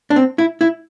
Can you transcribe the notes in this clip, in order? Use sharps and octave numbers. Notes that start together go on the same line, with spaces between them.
D4
C4
E4
E4